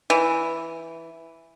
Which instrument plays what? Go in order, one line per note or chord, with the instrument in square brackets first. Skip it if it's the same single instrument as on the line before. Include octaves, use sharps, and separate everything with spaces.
[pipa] E3